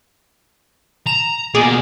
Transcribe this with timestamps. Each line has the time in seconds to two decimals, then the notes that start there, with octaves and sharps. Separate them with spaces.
1.07 A#5 E7
1.55 B2 A#3 G#4 D5